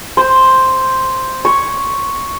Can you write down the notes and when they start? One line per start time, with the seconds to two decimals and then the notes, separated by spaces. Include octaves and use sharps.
0.17 C5
1.45 C#5